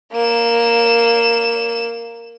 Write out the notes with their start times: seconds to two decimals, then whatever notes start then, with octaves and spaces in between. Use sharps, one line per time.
0.13 A#3 E7